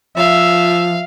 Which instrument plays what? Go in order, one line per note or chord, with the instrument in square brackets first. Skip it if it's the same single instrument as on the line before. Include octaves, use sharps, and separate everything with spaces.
[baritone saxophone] F3 [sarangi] E5 [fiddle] F5